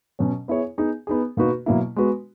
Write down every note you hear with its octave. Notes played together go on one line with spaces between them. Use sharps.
B2 F#3 C#4
B3 E4 G#4 C#5
B3 D#4 G#4
B3 D#4 G#4
B2 A#3 D#4 F#4 B4
B2 F#3 A#3 E4
G#3 B3 F#4 B4